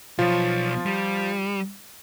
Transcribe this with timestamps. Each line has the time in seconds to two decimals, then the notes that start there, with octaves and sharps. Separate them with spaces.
0.19 B1 F3 F4 C#5
0.86 G3